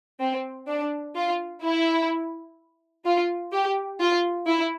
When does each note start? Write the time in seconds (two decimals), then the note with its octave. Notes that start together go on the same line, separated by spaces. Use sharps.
0.21 C4
0.68 D4
1.16 F4
1.63 E4
3.05 F4
3.52 G4
4.00 F4
4.47 E4